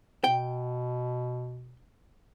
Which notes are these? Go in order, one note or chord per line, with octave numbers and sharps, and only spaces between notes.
B2 G5